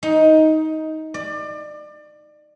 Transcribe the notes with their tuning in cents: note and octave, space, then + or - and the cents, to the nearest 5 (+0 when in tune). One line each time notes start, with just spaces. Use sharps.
D#4 +15
D5 +30